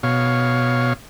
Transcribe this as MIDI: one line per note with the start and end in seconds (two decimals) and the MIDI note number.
0.03 0.93 47
0.03 0.93 73
0.03 0.93 77